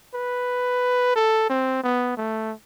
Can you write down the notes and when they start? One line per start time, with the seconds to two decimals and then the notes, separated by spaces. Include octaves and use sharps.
0.14 B4
1.16 A4
1.50 C4
1.84 B3
2.17 A3